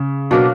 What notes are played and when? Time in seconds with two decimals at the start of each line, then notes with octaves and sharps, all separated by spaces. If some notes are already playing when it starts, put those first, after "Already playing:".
Already playing: C#3
0.31 B2 F#3 A#3 D4 A#4